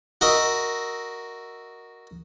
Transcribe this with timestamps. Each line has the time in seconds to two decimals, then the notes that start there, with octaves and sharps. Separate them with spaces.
0.21 F#4 A#4 D#5 E5